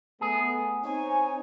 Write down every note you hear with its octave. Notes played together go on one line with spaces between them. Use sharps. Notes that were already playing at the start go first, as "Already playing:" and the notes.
A3 B3 G#4
C4 D#4 C#5 G#5